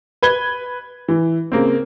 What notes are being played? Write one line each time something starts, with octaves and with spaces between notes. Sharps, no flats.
B4 G#6 G7
E3
C#3 A#3 C4